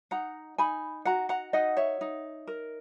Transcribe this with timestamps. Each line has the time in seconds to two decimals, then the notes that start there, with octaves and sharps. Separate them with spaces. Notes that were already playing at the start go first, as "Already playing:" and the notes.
0.11 D#4 F#5 A#5
0.58 D#4 G#5 B5
1.05 F#4 F#5 A#5
1.29 F#5 A#5
1.53 D#4 D#5 F#5
1.77 C#5 E5
2.01 D#4
2.47 A#4